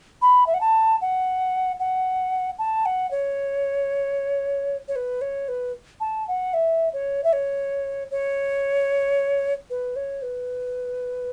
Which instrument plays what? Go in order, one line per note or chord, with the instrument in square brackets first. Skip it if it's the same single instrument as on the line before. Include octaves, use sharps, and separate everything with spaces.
[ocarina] B5
E5
F#5
A5
F#5
F#5
A5
F#5
C#5
C#5
B4
C#5
B4
A5
F#5
E5
C#5
E5
C#5
C#5
B4
C#5
B4